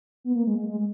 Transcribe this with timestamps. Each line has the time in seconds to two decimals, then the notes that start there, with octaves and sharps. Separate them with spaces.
0.24 B3
0.35 A#3
0.47 G#3
0.58 G#3
0.68 G#3